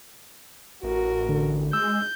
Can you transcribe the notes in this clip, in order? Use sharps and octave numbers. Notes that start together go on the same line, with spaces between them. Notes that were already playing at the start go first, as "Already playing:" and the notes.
A1 F#4 A#4
D3
G#3 E6 G6